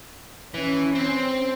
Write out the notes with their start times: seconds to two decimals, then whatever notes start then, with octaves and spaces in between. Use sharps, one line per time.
0.54 E3 C#4
0.95 C4